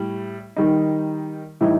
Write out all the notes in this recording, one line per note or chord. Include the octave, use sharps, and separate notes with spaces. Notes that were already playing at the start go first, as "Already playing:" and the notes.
Already playing: A2 G3
D#3 G3 D#4
A2 E3 G3 D#4